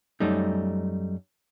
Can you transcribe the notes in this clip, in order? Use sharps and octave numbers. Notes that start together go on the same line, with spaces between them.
F#2 G3 A3 D#4